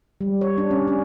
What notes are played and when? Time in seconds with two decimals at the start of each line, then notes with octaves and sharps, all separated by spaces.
0.21 G3
0.41 C#5
0.58 D4
0.70 C#4
0.88 C#4